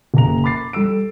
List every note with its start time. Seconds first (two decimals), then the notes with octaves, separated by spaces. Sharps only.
0.14 F#1 A#3 A#5 F7
0.44 B5 D6 A6 C7
0.73 G3 A4 E6 D7